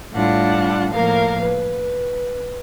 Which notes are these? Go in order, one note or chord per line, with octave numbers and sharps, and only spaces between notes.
A2 G3 D4 F4 F#5
A2 F3 A#3 A#4 F5
B4